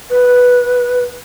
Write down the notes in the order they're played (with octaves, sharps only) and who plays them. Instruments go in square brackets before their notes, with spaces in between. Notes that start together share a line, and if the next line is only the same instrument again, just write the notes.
[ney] B4